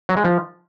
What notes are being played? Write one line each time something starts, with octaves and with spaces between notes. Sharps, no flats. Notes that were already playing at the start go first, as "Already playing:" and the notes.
F#3
G#3
F3